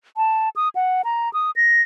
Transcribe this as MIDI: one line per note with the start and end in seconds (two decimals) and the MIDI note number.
0.17 0.49 81
0.56 0.69 87
0.75 1.02 78
1.05 1.32 82
1.33 1.51 87
1.56 1.82 94